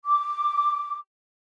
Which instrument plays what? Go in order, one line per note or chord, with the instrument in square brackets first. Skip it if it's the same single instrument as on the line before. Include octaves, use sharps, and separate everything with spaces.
[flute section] D6